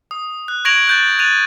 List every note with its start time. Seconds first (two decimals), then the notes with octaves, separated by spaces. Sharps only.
0.11 D#6
0.48 F#6
0.65 C#6 G#6 A#6 D7 F7 F#7
0.88 F#6 G6 A6
1.19 F#6 A6 D#7 F7